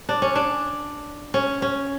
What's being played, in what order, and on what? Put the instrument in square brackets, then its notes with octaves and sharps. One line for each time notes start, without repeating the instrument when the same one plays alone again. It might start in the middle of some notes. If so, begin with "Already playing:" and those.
[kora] D4
C#4
D4
C#4
C#4